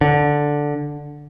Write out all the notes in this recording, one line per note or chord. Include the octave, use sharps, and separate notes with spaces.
D3